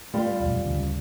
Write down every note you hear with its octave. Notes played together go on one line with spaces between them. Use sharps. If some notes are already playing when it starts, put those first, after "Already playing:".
G3 A3 B3 F4
D#1 B1 F2
D2 G2 C#3